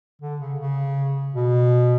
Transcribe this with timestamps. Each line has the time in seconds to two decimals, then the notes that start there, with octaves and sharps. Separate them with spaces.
0.22 D3
0.40 C#3
0.59 C#3
1.34 B2